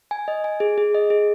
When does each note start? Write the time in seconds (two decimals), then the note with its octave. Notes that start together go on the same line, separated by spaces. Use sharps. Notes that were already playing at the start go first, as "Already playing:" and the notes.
0.11 G#5
0.28 D#5
0.44 G#5
0.60 G#4
0.78 G#4
0.94 D#5
1.10 G#4